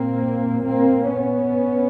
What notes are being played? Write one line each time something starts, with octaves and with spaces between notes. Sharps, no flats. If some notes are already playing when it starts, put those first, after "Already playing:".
Already playing: A#2 A#3 C4
A#3 C4
B3 C#4